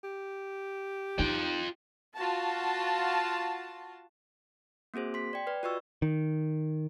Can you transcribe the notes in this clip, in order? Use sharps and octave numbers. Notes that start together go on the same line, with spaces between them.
G4
D#4 F4 G5
F4 F#4 A5
A#3 C4 F#4 G#4 C5
C6 B6
D5 G5
B4 D5
F4 F#4 B4 D#5 C#6 E6
D#3